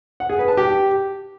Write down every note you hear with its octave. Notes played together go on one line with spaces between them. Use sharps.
F#5
G#4
B4
A5
G4